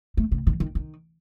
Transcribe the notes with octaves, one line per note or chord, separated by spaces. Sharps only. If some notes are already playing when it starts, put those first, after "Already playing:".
A3
C#3
D#3
D#3
D#3